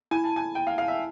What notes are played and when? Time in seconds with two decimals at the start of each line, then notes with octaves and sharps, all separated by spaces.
0.11 E4 G#5
0.24 A5
0.36 G#5
0.55 G5
0.67 F5
0.78 F5
0.88 E5